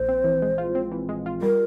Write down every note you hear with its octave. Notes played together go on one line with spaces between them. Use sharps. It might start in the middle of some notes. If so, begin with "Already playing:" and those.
Already playing: A#1 C5
C4
E3
G#3
F4
C4
E3
G#3
F4
G3 A#4